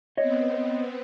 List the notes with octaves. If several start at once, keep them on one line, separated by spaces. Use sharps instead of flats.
B3 C4 C#5 D#5